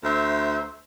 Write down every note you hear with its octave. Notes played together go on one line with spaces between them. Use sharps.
D2 C5 E5